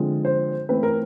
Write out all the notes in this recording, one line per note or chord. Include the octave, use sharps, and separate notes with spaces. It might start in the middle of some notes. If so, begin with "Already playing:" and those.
Already playing: D3 F3 G#3 C4
C5
E3 A3 C4 B4
A#4